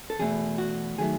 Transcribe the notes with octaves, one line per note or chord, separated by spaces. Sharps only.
A4
E2 B2 A3 G#4
F#4
D#3 F#3 A3 G#4